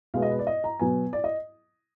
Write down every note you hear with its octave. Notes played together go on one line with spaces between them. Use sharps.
B2 G#3 B3 F5
D#5
B4
D5
D#5
A#5
B2 F#3 B3 G#5
D5
D#5